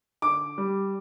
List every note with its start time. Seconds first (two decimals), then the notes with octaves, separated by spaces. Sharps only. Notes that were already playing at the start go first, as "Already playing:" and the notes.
0.22 D3 D6
0.58 G3